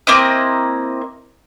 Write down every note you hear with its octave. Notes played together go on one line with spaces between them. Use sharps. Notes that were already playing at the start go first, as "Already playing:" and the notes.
A#3 C4 E4 D#5